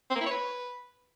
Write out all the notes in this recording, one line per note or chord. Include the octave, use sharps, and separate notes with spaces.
C4
A#3
E4
C#5
B4